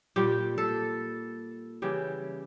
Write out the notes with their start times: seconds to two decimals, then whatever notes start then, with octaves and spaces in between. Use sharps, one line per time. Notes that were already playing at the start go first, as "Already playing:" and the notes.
0.16 A#2 G3 G4
0.58 A4
1.82 C#3 E3 G3 G4